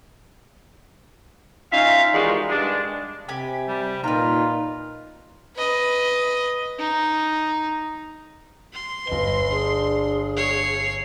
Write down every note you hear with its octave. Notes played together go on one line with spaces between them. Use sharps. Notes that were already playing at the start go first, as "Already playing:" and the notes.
C#4 D#4 F4 E5 F5
D#3 E3 G3 G#3 F4 F#4
G2 G#3 D4
C3 G4 G#5 B5
G3
A#2 D#4 F4 B4 A#5
B4 D#5
D#4
C6
G1 B4 D#5 G7
D4 G#4
C#5 C7